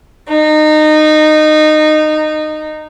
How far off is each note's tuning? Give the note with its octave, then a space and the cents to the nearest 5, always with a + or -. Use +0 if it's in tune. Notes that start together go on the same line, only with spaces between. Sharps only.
D#4 -20